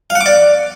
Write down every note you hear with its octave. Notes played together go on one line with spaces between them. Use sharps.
F5
F#5
D6
D5